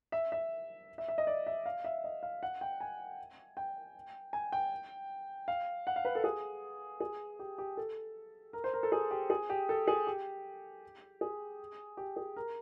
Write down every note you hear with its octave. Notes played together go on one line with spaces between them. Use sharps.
E5
E5
E5
E5
D#5
D5
E5
F5
E5
D#5
F5
F#5
G5
G#5
G5
G#5
G5
F5
F#5
F5
B4
A4
G#4
G#4
G4
G4
A4
A#4
C5
A#4
A4
G#4
G4
G#4
G4
A4
G#4
G4
G#4
G4
G#4
A#4